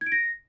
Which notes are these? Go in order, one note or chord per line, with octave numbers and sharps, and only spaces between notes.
G#6
D7
A#6